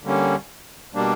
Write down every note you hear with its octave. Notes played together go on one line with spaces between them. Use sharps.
D3 G3 A#3 C#4
B2 G3 A#3 D4